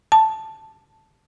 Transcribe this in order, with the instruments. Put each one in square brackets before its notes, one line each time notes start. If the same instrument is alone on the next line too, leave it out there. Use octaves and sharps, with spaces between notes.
[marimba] A5